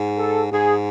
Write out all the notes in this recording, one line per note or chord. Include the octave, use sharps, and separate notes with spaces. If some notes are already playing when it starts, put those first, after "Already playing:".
Already playing: G#2
A4
G#2 G#4